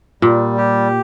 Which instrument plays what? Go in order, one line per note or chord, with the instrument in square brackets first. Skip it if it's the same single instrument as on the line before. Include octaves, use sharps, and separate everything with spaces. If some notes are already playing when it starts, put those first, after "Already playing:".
[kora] A#2 [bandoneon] G3
[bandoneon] G4